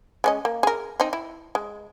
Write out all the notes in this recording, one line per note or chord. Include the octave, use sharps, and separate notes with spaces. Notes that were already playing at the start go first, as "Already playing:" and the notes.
G#3 C#4 D#5
A#3
G#4 A#4
C4 D#4
E4
G#3